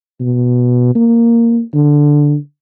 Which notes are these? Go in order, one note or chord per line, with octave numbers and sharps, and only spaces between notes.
B2
A#3
D3